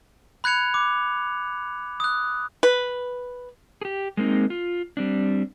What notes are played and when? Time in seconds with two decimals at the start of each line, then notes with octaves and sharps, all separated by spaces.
0.44 B5 F#6 G#6 C#7 F7
0.74 D6
2.00 D#6 F#6
2.63 B4
3.81 G4 G#4
4.17 G#3 A#3 C4 D#4
4.50 F4
4.97 G3 C4 D4